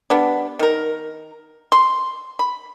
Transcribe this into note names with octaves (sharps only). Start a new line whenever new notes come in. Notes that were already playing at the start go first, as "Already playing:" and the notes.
G3 B3 D4
D#3 A#4
C6
B5